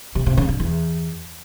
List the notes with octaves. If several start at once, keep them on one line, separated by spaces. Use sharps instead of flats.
C3
C3
C#3
D3
E2